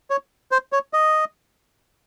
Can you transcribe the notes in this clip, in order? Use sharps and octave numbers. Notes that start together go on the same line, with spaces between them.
C#5
C5
C#5
D#5